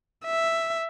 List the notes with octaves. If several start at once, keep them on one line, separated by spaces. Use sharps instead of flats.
E5